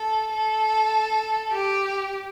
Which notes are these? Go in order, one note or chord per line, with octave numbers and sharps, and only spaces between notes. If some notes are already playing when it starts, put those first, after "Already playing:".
Already playing: A4
A4
G4